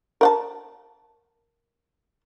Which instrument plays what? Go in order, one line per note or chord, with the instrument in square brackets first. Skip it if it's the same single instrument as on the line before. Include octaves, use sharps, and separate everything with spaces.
[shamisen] A#4 F#5 A5